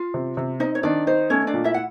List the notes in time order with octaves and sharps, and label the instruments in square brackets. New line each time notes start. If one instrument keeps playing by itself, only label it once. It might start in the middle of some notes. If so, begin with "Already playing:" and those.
Already playing: [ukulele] F4 F5
[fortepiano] C3
C3
[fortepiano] C4 [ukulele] D#4 D#5
[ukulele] C#5
[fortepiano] D#3 [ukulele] D4 D5
[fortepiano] D#4 [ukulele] C5
[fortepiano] A3 [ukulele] C#4 C#5
[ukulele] D4 D5
[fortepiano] A#2
[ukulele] E4 E5
F#5